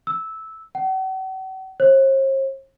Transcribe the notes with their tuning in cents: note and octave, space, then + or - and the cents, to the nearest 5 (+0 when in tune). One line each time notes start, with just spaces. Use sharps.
E6 -10
F#5 +45
C5 +45